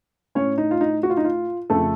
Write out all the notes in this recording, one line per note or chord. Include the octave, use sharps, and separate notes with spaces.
A2 C#4 C#5
D#4
F4
D#4
F#4
F4
D#4
F4
F2 C#3 A3 A4